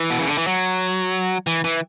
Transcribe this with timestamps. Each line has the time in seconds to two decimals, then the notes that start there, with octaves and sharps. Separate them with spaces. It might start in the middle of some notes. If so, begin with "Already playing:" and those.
Already playing: E3
0.10 B2
0.19 C#3
0.28 D3
0.38 E3
0.47 F#3
1.47 E3
1.64 E3